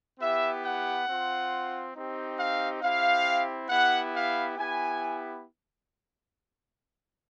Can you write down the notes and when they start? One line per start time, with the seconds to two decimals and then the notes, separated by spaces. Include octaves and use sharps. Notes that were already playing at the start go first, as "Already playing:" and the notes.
0.20 B3 E4 G4 E5
0.63 F#5
1.07 C4 F4
1.95 C4 D#4 G4
2.39 F5
2.82 C4 E4 G4 F5
3.69 B3 E4 G4 F#5
4.14 F5
4.58 B3 E4 G4 G#5